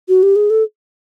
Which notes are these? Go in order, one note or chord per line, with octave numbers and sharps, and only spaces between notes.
F#4
G4
G#4
A4